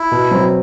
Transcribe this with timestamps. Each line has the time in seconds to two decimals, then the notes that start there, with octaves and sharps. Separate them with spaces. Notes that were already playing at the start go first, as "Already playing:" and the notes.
Already playing: E4
0.12 B2
0.31 F#3 C4